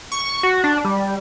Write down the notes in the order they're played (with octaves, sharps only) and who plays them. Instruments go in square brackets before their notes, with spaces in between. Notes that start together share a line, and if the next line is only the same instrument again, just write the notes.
[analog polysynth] C#6
F#4
D4
G3